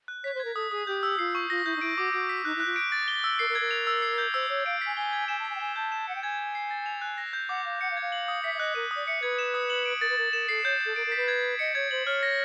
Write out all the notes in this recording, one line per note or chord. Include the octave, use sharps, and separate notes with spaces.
F#6
C#5 B6
C5
A#4 G#6
A4 D#6
G#4 D#6
G4 G6
E6
F4 C7
C#6
F4 A#6
E4 G6
D#4
E4 D7
F#4 D6
F#4 D7
B6
D#4 F#6
E4 F#6
F4
D7
A6
G7
E6
A#4 C7
A#4
G#6
A#4
F7
E6
C7
G6
C5 E6
C#5 E6
F5 D7
G#5 B6
G#5 G7
G#6
G#5 E7
A5
B6
G#5
G5
G#5 G7
A5 G6
E7
F#5 C#7
G5
G#5 G#6
G#6
C7
A6
F7
F#6
A#6
G6
F#5 D6
F5 D6
F#5 C#7
F5
G#6
F5
F#7
D#6
E5 B6
E5
D#5 F#6
A#4 D#7
D#6
D5
E5 C#7
B4 G#6
E7
D#6
F#7
D7
A#4 A6
B4
A#4 A6
A#4 E7
A4 C7
C#5 G6
G6
A4
A#4 D7
A#4
B6
B4
G#6
G#6
D#5 C#7
C#5 G#6
C5 F#7
C#5 F6
A#6